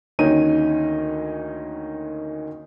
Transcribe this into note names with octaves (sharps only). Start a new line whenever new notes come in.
D2 D#3 A#3 C#4 D#4 D#7